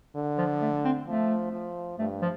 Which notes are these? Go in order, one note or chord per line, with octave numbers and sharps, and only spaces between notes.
D3
F3
A3
C4
F3 A3
F3
G2 A3
F3